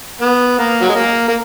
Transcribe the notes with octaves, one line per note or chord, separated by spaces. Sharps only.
B3
A#3
F#3
G#3
A#3
A#3